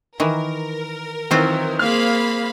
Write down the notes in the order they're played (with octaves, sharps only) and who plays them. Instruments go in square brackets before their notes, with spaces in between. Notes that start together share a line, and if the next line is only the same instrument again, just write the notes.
[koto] D#3 E3 [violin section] A#4
[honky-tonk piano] D#3 E3 [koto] F#3 C4 F4
[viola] A#3 G#4 [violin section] C5 F5 B5 [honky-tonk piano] F6